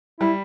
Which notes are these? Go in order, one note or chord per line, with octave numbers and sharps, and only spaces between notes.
G3 E4